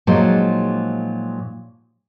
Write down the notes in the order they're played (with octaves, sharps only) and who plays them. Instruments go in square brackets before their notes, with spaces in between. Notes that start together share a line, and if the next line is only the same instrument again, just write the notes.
[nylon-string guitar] A#2 F3 F#3 G#3 D#4